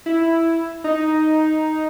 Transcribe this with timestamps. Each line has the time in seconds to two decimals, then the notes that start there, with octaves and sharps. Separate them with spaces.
0.06 E4
0.84 D#4